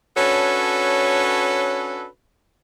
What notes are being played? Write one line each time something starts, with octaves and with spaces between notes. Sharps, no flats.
C#4 D4 F#4 A4 B4 C#5